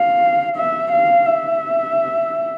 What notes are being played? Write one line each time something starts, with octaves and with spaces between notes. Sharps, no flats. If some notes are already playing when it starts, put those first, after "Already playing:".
Already playing: F5
E5
F5
E5